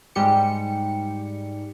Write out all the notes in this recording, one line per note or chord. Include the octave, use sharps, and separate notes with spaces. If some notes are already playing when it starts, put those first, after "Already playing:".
G#2 G3 G4 C#7